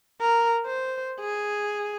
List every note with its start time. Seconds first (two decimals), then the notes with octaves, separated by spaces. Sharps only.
0.21 A#4
0.66 C5
1.20 G#4